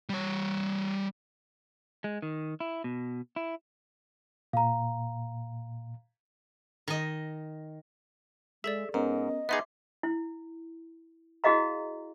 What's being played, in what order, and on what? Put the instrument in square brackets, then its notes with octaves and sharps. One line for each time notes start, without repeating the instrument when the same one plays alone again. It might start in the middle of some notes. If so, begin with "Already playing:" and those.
[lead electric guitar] G3 C#5
[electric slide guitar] G#3
D#3
E4
B2
E4
[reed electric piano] A#2 [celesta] F5 A#5
[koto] D#3 D#5
[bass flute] G#3 [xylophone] G#4 A4 D5 [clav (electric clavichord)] E5
[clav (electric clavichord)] G#2 [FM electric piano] B3 C#4 A#4 [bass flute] D#5
[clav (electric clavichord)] B3 D#4 G#4 [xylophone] E5 C6 D6
[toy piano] E4
E4 F#4 G#4 D#5 F5 A#5